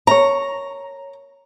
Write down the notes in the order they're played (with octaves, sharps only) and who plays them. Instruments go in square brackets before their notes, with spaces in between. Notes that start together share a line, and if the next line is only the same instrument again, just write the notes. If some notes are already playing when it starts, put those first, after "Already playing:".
[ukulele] A#4 C#5 [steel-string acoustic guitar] A#5